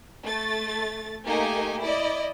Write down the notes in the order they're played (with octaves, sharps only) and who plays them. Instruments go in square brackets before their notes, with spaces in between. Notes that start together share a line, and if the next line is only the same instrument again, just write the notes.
[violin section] A3 A6
A3 A#3 D#4 G4 G#5
E4 D5 D#5